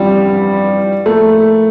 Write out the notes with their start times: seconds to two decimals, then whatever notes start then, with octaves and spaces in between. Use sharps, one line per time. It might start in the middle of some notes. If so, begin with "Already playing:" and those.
Already playing: A1 G2 F3 G3 C4 G4
1.06 A2 F3 A3 A#3 E4